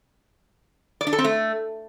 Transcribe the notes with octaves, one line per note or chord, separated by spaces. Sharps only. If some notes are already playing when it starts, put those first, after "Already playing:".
D5
D4
A4
C4
A3